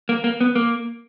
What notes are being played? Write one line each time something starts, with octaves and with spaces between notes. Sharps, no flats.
A#3
A#3
B3
A#3